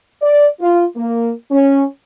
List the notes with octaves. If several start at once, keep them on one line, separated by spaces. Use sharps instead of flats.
D5
F4
A#3
C#4